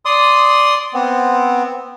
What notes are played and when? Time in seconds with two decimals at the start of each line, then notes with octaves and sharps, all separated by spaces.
0.05 D5 C6 D#6
0.94 B3 C4